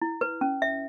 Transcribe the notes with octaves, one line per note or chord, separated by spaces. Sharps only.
E4
B4
C#4
E5